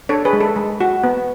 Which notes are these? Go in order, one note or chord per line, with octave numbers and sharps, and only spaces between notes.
D4 A4 C#5
G#4 B4
G#3
A4
G#3
F#4
B3